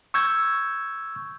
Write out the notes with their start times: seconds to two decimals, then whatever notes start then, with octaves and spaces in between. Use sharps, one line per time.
0.14 C#6 E6 G6 G#6